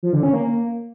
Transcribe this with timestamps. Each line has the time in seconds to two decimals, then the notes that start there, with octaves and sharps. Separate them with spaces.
0.03 F3
0.13 D3
0.23 C#4
0.33 A#3